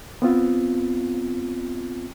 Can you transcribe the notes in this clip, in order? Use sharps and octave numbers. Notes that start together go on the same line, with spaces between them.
B3 C4 F4